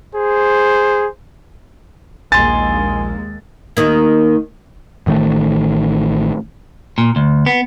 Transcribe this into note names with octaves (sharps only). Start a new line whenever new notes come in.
G#4 C5
A#1 D#2 G#3 A#3 G#5 C6 A6
D#2 D#3 A#3
A1 D#3 F#3 A3
A#2
D2
B3